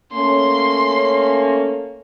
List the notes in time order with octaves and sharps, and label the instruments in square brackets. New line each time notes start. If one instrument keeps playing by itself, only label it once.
[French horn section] A3 A#3 C#4 [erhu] C6